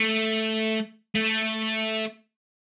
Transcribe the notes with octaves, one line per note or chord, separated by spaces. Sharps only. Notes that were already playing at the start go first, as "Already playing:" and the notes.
Already playing: A3
A3